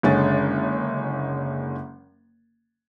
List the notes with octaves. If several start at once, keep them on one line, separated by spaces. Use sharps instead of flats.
F#1 D3 G#3 C#4 A6